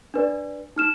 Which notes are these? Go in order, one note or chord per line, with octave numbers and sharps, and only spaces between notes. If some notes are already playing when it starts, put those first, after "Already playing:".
D4 B4 D5
D#4 F6 E7